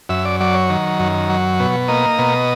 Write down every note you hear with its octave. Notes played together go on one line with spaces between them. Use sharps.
F#2 E5
D5
F#3 D5
C#5
D#3
F#2
F#3
B2
A#3 D#5
B2